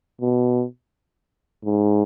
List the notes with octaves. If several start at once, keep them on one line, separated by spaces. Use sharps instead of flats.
B2
G#2